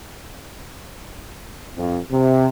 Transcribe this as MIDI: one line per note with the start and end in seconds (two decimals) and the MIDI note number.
1.77 1.99 41
2.11 2.48 48